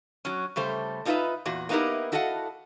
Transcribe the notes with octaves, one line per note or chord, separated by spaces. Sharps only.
F#3 C#4
C#3 G3 A3 C5
D4 D#4 F4 A4 B4 E5
E2 A#2 F#4
A#3 B3 D#4 E4 G4 A#4
E4 F#4 A4 D#5 F5 F#5